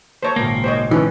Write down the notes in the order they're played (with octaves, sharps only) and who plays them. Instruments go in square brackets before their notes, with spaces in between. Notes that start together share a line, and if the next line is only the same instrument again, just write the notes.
[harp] A#3 A4 E5 [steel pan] C5 C#5
[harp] G#1 A#2 C#3 [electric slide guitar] A#3
[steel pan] C5 C#5 D#5
[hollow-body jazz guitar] E3 C#4 [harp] G5 G#5